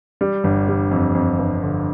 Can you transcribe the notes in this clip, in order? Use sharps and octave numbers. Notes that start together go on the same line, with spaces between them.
G3
G1
G3
F2
F2
G1
D3